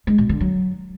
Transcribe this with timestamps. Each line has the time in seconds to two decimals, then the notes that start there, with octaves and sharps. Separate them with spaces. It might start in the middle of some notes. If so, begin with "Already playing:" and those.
0.07 G#3
0.18 B2
0.29 D3
0.40 F#3